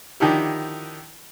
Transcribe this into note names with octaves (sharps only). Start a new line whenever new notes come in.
D3 D#3 F3 D#4 E4 G4